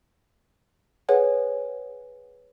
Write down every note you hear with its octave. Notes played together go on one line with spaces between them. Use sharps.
G#4 B4 C#5 F#5 G#5